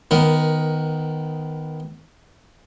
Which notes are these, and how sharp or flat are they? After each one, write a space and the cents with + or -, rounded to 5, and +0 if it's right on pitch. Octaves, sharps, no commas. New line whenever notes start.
D#3 +0 B3 +10 A#4 +20